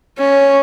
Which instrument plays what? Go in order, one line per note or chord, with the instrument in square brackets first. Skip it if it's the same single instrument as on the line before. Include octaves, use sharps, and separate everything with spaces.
[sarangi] C#4